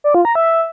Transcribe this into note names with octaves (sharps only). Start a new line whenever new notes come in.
D5
F4
A#5
E5